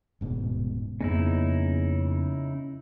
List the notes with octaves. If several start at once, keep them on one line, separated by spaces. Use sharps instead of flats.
D#1 G#2 B2
F2 C#3 A#3 B3 D#4 E4